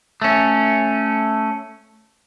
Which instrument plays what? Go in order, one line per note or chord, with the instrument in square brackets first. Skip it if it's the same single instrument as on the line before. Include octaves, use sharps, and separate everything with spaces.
[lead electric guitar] A3 C#4